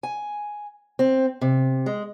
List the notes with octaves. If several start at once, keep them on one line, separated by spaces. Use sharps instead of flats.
G#5
C4
C3
G#3